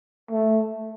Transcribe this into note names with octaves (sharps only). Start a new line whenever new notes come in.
A3